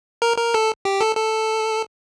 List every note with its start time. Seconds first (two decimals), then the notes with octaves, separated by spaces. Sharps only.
0.22 A#4
0.38 A#4
0.54 A4
0.85 G4
1.01 A4
1.16 A4